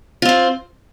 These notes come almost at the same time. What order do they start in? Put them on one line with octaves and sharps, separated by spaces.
F4 C4 C5